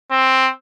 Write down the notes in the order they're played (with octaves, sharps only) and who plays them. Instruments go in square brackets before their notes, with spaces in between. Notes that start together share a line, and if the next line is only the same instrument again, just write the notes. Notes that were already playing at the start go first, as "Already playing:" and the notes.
[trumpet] C4